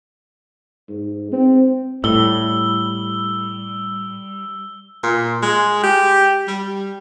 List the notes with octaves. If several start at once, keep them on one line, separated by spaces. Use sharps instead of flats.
G#2
C4
A2 G3 E6 G7
A#2
G#3
G4
G3